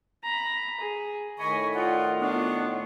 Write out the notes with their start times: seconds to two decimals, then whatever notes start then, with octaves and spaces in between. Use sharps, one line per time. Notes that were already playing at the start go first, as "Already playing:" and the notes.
0.23 A#5 B5
0.80 G#4
1.39 A2 D#3 D#5 G#5 B5 C#6
1.74 F4 D5 D#5 F#5
2.20 B3 D4 F4 C#6